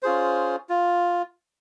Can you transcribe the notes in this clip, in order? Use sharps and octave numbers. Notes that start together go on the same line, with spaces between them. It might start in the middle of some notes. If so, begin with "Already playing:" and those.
C#4 F4 G#4 C5
F4